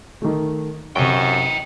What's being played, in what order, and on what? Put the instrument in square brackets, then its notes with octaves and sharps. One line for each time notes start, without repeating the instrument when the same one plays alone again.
[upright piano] D#3 A3
[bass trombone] F#2 [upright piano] C3 C#6 [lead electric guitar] D#5 G5